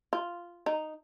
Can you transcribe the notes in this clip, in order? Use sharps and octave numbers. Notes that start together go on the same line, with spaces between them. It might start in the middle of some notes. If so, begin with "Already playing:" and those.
F4
D#4